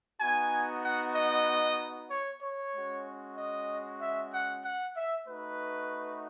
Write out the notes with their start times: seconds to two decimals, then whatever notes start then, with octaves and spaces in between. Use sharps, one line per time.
0.21 B3 D#4 F#4 G#5
0.84 F#5
1.16 D#5
2.11 C#5
2.42 C#5
2.74 G#3 C#4 F#4
3.37 D#5
4.01 E5
4.33 F#5
4.64 F#5
4.96 E5
5.28 A3 D#4 F#4 B4